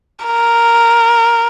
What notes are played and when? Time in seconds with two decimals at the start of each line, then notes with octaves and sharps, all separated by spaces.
0.26 A#4